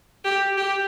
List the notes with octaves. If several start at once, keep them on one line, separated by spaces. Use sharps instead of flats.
G4
G4